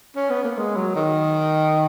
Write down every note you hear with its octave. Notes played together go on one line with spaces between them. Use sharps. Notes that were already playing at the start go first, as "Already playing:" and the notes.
C#4
B3
A#3
G#3
F#3
D#3